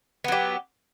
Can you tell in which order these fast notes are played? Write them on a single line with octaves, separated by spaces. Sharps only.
B3 F#3 G4